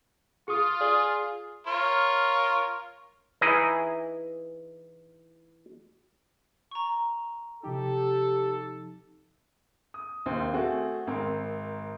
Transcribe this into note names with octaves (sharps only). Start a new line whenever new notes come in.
F4 G#4 D#6
G#4 D5 D#6
F4 A#4 C#5
E3 D#4 E4 G#4 D#5
A#5 C#6
C3 F3 D#4 G4 A4
D#6
A#1 D#2 C4 C5
A3 C4 F#4 G#4
G#1 C4 A#4 C6